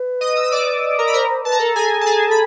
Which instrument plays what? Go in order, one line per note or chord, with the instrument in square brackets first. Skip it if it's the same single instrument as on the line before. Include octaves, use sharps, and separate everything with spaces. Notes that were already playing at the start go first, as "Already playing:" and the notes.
Already playing: [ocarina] B4
[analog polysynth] D#5 D#6
E6
D#6
D5 D6
A#4 A#5
B5
[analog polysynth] A#4 A#5 [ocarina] C5
[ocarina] C5
[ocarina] B4 [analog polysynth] A5
[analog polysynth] A#5
[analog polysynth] A4 A5 [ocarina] A#4
[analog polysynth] G#4 G#5 [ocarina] A4
[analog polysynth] A5
G#4 G#5
B5